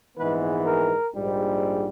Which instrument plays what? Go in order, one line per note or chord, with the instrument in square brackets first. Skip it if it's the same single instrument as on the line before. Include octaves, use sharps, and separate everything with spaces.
[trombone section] A#1 G#2 E3 G#3 B3 B4
A#4
A#1 G#2 G3